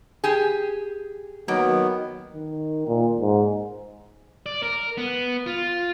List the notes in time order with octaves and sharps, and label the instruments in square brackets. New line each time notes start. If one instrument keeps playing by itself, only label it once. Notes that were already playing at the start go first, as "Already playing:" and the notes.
[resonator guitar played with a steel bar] G4 G#4
[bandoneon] D#3 B3 [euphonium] F#3 [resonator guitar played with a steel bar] A#3
[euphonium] D#3
A#2
G#2
[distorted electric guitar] D5
A#4
B3
F4